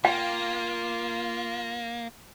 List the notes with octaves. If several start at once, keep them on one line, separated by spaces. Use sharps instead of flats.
A#3 F4 G5